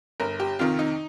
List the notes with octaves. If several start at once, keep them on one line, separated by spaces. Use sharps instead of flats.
G1 A#4
G4
F2 C3 D#3 F4
D#4